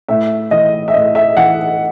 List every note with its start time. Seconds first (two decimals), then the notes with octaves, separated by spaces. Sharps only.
0.08 A2 E5
0.51 E3 D#5
0.88 E5
0.94 A2 D#5
1.15 E5
1.37 E3 F#5